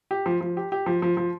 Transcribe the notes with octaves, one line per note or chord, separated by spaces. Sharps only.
G4
F3
F3
G4
G4
F3
F3
F3